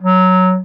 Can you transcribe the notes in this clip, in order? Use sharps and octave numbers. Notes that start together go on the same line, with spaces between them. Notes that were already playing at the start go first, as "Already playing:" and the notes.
F#3